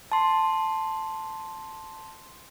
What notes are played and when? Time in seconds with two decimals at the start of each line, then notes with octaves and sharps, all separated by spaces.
0.12 A5 C6